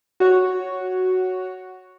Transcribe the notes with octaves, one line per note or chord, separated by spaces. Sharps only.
F#4 C#5